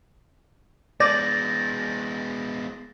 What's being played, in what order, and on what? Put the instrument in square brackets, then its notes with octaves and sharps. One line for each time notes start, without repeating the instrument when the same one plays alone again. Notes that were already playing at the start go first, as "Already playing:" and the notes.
[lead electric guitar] G#3 B3 [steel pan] D5 [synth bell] G6 A6 A#6